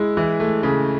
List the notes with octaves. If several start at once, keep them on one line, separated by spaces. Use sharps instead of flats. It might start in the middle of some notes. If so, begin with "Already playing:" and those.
Already playing: G#3 E4
E3
A3
C#3